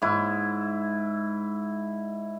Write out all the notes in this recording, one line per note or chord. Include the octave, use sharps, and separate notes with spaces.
G#2 E4